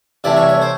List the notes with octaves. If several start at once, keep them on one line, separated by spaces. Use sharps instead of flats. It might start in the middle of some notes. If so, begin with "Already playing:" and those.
C3 E3 A3 D5
C#5
C#5
C5